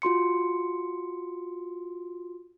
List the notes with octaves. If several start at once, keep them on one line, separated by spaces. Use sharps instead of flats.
F4 F#4 C6 C#7